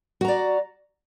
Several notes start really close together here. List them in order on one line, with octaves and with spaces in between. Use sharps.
F#4 A#5 D5